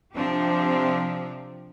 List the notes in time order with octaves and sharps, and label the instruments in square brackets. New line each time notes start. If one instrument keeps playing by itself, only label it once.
[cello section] C3 F3 C4 D4 G4